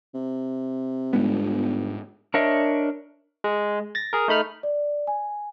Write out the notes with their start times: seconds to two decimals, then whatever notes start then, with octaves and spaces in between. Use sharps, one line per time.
0.14 C3
1.13 G1 G#2 G#3 B3
2.34 D4 A#4 C#5 D#5 E5
3.44 G#3
3.95 A6 A#6
4.13 G#4 A#4
4.28 A3 D#4 B5 F6
4.63 D5
5.07 G#5